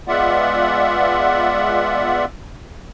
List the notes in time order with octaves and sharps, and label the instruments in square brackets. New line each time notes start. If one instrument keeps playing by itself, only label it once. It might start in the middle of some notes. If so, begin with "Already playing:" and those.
[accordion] G#3 B3 F4 D5 E5 F#5